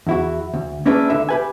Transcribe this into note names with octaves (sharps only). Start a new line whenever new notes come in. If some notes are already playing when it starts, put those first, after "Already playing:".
E2 E4 F#4
D2
A#3 C#4 D4 E4 G#4 B4
C#2 D3 E5
G4 B4 G#5